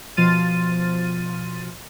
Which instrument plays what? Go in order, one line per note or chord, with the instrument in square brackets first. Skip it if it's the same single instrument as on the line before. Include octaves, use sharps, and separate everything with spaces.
[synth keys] B2 F3 C6 F6 A6 D#7